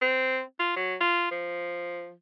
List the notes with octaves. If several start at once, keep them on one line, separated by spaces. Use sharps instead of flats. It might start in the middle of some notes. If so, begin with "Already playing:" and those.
C4
F4
F#3
F4
F3